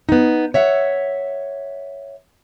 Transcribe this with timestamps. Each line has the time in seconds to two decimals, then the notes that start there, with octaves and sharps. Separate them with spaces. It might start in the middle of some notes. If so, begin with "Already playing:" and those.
0.09 B3 D#4
0.54 C#5 E5 F#5